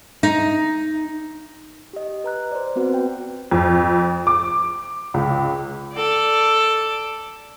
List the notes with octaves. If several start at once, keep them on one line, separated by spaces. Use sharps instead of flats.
D#4
G4 D#5
B4 A#5 F#6
C5 D5
B3 C4 F#4 B4
G5
F2
D6
C#2
A4 D5